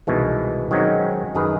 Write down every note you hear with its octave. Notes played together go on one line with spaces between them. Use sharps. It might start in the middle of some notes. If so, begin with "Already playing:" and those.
C2 B2 D#3 E3 G#3
D#3 F#3 G#3 C4 C#4 D#4
F#2 D#3 G#4 A#4 B4